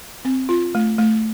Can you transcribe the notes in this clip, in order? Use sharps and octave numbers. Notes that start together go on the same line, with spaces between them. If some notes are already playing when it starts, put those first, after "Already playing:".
C4
F4
A3
A3